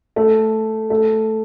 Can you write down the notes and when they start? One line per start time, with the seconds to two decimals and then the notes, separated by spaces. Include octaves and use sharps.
0.16 A3
0.90 A3